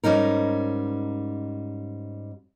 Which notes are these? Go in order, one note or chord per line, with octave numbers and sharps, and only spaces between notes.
G#2 G3 C#4 D#4 A#4